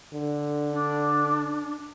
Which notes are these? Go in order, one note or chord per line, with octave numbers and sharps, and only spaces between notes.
D3
D4